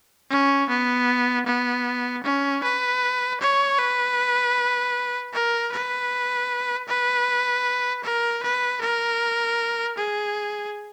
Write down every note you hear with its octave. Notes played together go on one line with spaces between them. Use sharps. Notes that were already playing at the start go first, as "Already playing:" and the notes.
C#4
B3
B3
C#4
B4
C#5
B4
A#4
B4
B4
A#4
B4
A#4
G#4